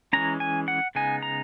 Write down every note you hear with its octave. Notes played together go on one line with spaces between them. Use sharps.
E3 G#3 C#4 A#5
G#5
F#5
C#3 G#3 B3 D#4 G#5
A#5